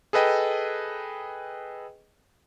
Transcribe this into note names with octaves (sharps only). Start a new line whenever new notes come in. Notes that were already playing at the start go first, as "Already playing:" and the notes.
G#4 A4 B4 D#5 G5